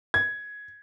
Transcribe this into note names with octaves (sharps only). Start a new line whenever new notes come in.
G#6